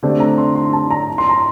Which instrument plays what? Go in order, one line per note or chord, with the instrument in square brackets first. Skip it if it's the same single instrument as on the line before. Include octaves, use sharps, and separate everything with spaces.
[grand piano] D3 A3 C4 G4 C5 [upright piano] D5
[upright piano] A#5
C6
C6
A5
A#5
C6
A#5